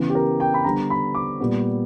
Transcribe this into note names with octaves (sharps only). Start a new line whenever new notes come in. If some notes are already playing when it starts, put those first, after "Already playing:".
Already playing: C#3 E3 B3
G4
A#4
G5
B5
D3 G3 B3 A#5
B5
D6
A#2 G3 B3